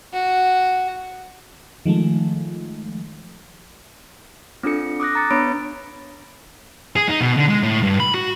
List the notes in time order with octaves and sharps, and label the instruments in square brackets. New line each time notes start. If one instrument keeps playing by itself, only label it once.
[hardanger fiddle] F#4
[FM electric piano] D#3 F3 G#3 A3
[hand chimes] C4 D4 F4 A4 C#7
D6 D#6 F#6 A#6
A#5 A6 C#7
B3 D4 C#5 B5 D7
[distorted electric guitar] G#4
D#4
B2
D3
G#3
A2
G2
B5
F#4